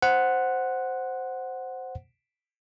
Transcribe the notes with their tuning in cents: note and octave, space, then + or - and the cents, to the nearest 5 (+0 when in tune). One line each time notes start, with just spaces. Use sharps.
C5 +0 F#5 +0